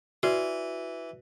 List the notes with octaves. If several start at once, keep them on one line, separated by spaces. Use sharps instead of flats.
E3 F#4 B4 D5